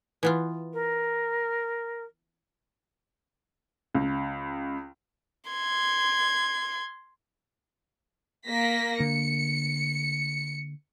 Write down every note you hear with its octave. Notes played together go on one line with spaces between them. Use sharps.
E3 B3 F4
A#4
C#2
C6 G#6
A#3 A#6 B6
D3 A#3 C#7